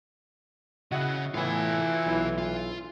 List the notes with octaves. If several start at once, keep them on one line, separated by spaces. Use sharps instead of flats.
C#3 E4 F#4 D#5 E5 F#5
A2 E3 B3 F4 G#5
B1 E4
F4